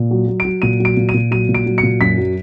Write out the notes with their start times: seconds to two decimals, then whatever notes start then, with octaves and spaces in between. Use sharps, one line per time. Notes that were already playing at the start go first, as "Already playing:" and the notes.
Already playing: A#2
0.11 F#3
0.28 F#3
0.40 D7
0.45 F#3
0.62 A#2 D#7
0.80 F#3
0.85 D7
0.97 A#2
1.09 D#7
1.14 A#2
1.31 F#3 D#7
1.49 A#2
1.55 D7
1.66 F#3
1.78 C#7
1.83 A#2
2.01 F#2 B6
2.18 F#3